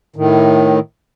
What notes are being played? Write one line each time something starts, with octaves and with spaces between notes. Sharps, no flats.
A2 D#3